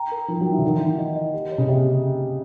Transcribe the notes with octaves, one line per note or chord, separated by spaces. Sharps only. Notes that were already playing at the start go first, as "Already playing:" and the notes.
Already playing: G5 A#5
A#4
F3 A#4
F#3
G5
E3
D3
D#3 A#4
E3
F#5
E3
D#5
D#5
G4
C#5
C#3
C3 G4